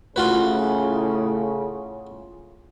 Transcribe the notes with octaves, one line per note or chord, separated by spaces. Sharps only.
A2 C#3 F4 F#4 B4